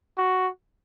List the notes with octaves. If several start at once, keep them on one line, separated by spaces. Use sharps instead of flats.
F#4